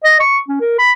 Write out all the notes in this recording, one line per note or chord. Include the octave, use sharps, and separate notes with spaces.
D#5
C#6
C#4
A#4
B5